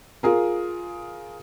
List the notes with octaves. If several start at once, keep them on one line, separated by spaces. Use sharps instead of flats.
F4 G#4 A#4